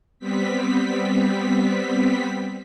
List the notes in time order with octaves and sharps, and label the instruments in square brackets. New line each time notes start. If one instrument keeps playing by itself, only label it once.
[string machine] G3 B3 C4 B6